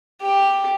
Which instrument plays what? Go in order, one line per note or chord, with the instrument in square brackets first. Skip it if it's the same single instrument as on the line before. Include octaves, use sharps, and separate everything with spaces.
[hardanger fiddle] G4